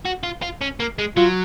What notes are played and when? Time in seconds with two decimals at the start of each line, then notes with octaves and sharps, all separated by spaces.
0.05 F#4
0.23 F4
0.42 F4
0.61 C#4
0.80 A#3
0.99 G#3
1.16 F#3 F4